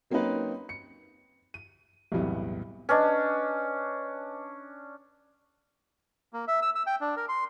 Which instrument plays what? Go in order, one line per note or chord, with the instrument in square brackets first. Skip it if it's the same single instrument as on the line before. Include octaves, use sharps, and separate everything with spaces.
[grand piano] F#3 A#3 C4 C#4 D#4 B4
C#7
D#7
B1 E2 A2 C3 G3 B3
[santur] C#4 D4 [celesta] B4 D#5
[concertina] A#3
E5
E6
E6
G5
D4
A#4
C6